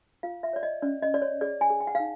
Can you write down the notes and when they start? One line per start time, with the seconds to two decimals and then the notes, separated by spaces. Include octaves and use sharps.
0.23 F4 F5
0.43 E5
0.53 C#5 D5
0.63 D#5
0.82 C#4 D5
1.03 D#5
1.12 C#4 D5
1.22 C#5
1.41 G#4 D5
1.61 G#5
1.70 G#4
1.80 G5
1.87 F#5
1.95 F5
2.00 D#4